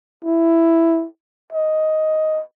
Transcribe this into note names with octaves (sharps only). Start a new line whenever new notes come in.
E4
D#5